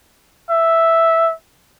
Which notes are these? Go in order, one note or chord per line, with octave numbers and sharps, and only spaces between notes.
E5